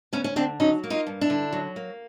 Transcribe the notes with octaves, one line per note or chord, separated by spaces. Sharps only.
D2 B3 C#4
C#4
D3 C4 D4
F#3 C#4 D#4
A#3
D#4 F4
G2
D4 E4
D3
F#3
A#3